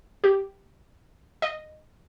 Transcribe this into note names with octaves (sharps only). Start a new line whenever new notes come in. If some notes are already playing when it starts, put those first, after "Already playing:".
G4
D#5